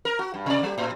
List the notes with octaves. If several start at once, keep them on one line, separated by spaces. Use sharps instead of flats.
A#4
F#4
G2
C3 D5
G3 G4
A2